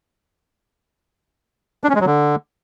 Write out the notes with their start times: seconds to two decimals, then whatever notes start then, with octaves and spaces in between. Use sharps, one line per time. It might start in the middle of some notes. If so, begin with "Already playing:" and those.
1.84 D4
1.89 C#4
1.95 G#3
2.01 F#3
2.06 D3